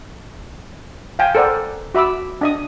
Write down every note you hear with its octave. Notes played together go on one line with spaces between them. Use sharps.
F5 G5 G#5
A4 A#4 C5 D5 F#5
F#4 E5 B5 D6 E6
D4 D#5 D#6